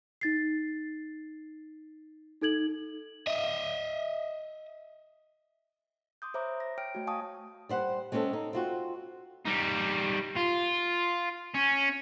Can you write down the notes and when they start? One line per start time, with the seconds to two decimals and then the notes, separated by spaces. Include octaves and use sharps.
0.21 D#4 A6 C7
2.41 D#4 A4 G#6 F#7
3.27 D#5 E5
6.22 C6 D6 D#6 G6
6.34 C5 C#5 E5 A#5 B5 D6
6.60 A#6
6.78 C#5 G5 F6 D7
6.95 A3 F#4
7.07 F5 G#5 A5 C#6 D#6
7.69 G3 C5 F#5
8.12 G#3 C4 C#4 F#4 A4
8.33 D#4
8.53 C4 F4 F#4
9.45 G3 D#4
10.36 F4
11.55 C#4